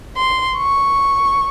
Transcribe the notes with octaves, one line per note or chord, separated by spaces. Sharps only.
C6
C#6